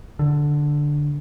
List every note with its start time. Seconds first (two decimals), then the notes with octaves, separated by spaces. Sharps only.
0.19 D3